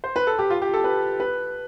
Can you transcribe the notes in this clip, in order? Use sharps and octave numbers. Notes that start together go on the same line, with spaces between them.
C5
B4
A4
G4
F4
G4
A4
B4
B4